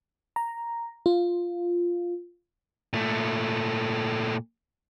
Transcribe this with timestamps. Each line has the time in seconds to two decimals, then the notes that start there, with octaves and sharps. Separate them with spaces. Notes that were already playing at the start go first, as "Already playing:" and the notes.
0.36 A#5
1.06 F4
2.93 A#2 A3